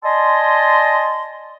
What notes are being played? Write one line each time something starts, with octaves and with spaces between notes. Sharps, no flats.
D5 D#5 G#5 A5 C6